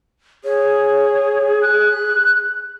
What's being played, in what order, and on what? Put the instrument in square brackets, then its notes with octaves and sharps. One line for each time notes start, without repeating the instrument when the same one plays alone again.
[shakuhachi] G#4 [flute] C#5
[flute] F#6